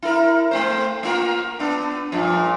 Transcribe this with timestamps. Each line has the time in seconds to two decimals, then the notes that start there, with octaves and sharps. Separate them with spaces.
0.03 E4 A#4
0.51 A3 C4 C5
1.03 A#3 F4 A#4
1.59 B3 D4
2.12 G2 A#2 F3